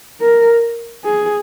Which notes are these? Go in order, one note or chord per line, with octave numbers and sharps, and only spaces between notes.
A#4
G#4